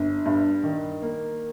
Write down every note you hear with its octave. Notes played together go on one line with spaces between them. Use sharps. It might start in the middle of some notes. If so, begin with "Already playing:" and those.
Already playing: G1
G2
D#3
A#3